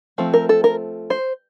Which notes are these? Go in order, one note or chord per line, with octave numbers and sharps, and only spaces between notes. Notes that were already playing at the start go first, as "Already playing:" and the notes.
F3 A3 C4
A#4
A4
A#4
C5